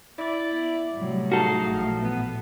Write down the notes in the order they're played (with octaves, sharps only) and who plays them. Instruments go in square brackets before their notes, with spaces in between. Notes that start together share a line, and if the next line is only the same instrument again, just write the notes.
[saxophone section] E4 D5
[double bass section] B3
[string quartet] A2 [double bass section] C3 F#3 G3
[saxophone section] D#4 G#4 F5 [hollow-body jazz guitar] F#4 A4
[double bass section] A1 A#2 F3
[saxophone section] B3